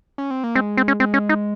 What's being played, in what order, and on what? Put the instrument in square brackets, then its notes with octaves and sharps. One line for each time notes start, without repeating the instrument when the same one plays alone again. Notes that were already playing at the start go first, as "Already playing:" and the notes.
[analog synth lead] C#4
C4
A#3
[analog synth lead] G#3 [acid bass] C4
[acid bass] C4
C#4
[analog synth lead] G#3 [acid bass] C4
[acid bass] C#4
D#4